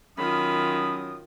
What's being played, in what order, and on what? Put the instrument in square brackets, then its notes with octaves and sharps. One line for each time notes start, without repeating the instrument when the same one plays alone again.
[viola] D#3 F4 [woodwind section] F#3 C#4 D#6 [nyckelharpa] B5